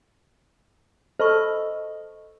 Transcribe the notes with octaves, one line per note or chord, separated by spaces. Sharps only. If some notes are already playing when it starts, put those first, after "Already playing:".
A4 C5 D#5 B5 C#6